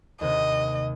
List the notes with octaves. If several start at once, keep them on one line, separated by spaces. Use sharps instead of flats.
D#2 C3 D#5